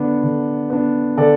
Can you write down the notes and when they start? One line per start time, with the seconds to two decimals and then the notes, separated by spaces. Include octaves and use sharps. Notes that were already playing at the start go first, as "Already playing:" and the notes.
Already playing: D3 B3 D4
0.23 D3
0.70 B3 D4
1.17 D3 A4 D5